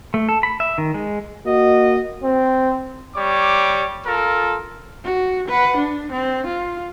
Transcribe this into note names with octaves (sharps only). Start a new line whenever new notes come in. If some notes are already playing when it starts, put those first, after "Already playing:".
A3
A4
B5
E5
D#3
G#3
A#3 F#4 D#5
C4
G3 C#5 D6
F4 A4 A#4
F#4
B4 F#5
D4
C4
F4